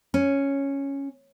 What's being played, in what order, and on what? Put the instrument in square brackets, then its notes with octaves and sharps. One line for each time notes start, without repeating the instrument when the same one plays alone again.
[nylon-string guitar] C#4